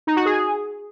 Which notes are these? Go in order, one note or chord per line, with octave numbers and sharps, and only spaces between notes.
D#4
F#4
G#4